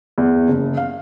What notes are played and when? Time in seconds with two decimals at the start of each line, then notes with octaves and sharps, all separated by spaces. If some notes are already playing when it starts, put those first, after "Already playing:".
0.18 E2
0.48 F#1
0.77 F5